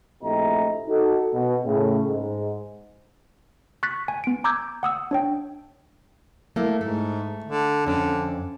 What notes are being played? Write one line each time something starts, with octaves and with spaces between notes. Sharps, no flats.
A#1 C3 A3 E4 D#5 A#5
D#4 F#4 A4
B2
A2 C#3
G#2
C#6 F#6 A6 B6
G#5
B3 D7
A#5 D6 E6 G6 G#6
F#5 D#6 E6
D4 C#5 G5
A3 A#3 E4
G#2 A3
D3
F2 D3 C#4